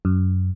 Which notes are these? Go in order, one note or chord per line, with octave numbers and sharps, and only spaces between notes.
F#2